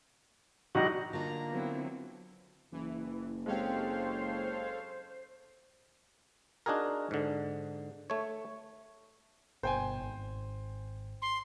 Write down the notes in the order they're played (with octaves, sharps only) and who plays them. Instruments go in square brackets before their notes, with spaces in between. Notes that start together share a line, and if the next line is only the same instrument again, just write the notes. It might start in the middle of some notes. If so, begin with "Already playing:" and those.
[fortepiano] A#1 G3 D#4 [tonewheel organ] F#4
[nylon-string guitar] D3 F4 [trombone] A#3 [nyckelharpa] A#5
[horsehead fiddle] F#3 C4 [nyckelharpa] B3 E4
[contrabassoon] F#1 [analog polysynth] E3
[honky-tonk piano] G#3 C4 G4 [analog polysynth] A4 C#5 F5 [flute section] C5
[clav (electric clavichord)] D4 D#4 F#4 G#4 A#4
G#2 D3
A3 C#5
[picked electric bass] G1 B2 [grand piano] C5 G5 G#5
[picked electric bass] G#1
[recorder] C6